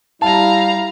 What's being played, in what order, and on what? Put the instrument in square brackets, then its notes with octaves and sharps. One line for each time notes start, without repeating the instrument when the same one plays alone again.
[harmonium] G3 E4 [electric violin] F5 A#5 [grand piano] A5